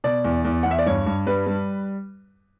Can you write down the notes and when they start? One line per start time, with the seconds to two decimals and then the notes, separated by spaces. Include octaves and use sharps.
0.04 B2 D5
0.24 E2
0.45 E2
0.63 E2 F#5
0.71 E5
0.79 D5
0.86 G2 C#5
1.06 G2
1.27 G3 B4
1.47 G3